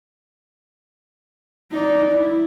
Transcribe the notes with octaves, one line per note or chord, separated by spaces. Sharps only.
D#4 D5
E4